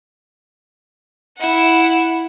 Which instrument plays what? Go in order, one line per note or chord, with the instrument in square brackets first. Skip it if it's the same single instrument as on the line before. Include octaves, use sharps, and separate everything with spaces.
[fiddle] E4 F#5